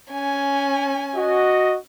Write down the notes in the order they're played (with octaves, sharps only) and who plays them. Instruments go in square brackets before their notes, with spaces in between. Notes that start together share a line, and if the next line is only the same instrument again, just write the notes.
[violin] C#4 G#5
[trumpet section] F#4 D#5